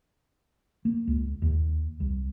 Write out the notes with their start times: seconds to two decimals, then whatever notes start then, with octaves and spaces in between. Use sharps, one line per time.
0.85 A#3
1.07 C#2
1.42 D#2
2.00 C2